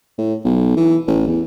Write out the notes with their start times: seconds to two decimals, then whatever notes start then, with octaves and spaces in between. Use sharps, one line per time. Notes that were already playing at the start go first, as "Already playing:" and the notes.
0.18 A2
0.44 B1
0.77 E3
1.07 A1
1.27 E2